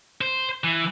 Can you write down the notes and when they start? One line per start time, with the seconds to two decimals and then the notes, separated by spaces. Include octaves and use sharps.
0.21 C5
0.64 E3